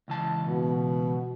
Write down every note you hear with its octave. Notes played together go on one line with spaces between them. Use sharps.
C#2 E3 A5
B2